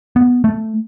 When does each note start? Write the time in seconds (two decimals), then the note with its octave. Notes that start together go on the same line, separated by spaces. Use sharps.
0.16 B3
0.44 A3